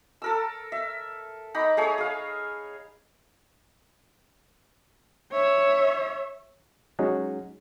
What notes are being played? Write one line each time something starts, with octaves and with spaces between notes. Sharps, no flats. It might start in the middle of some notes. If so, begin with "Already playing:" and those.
A4 A#4 E6
E5
D#4 A#5 B5 D6
A3 G#4 C#5 D#6
G#4 F5
C#5 E5
F#3 G#3 C#4 D#4 F#4 G#4